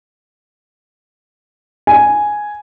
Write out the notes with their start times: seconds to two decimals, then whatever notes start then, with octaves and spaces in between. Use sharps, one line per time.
1.87 G#5